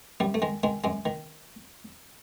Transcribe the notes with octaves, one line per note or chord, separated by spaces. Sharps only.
F#2 G3
A3
D#3 G#3
D#3 G#3
F#2 G#3
D#3